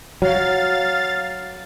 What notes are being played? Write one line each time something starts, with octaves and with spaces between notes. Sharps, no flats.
F#3 F5 A6